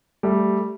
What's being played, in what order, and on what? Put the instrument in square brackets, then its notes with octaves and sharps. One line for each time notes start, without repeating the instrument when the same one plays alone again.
[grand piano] G3 A3